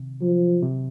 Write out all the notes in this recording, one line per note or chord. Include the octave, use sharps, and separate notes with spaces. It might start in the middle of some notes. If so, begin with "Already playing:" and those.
Already playing: C3 D#3
F3 F#3
C3